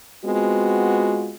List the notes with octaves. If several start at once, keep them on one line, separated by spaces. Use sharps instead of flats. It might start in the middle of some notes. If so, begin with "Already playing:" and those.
G#3 B3 C4 F4 F#4